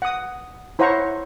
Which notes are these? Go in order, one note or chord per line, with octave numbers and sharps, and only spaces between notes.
F#5 D#6
E4 C5 C#5 F#5 A#5 C#6